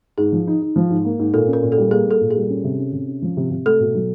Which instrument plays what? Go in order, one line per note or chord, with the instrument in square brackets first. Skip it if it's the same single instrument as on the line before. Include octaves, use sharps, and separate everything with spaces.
[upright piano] G#2 [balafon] G#4
[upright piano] F3
D#4
D#4
F3
G#2
A#3
G#2
[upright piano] A#2 [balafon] A4
[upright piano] C#4
[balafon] A#4
[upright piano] A#2
[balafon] A4
[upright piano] G3
[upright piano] A#3 [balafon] G#4
[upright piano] A#3 [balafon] A4
[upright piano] A#2
[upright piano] G3 [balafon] G#4
[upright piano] C#4
C3
C#4
C3
C#4
F3
C3
C3
[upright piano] A3 [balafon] A4
[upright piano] B2
F#3